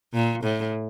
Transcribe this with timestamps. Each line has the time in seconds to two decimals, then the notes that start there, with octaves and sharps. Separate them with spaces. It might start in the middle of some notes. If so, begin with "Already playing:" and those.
0.14 A#2
0.43 A2